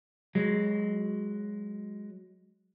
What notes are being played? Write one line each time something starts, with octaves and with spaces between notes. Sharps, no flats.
F#3 G#3